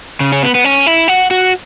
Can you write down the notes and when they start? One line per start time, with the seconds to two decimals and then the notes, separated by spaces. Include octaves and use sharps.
0.20 C#3
0.32 C#4
0.43 B3
0.55 B3
0.64 C#4
0.86 E4
1.08 F#4
1.31 F#4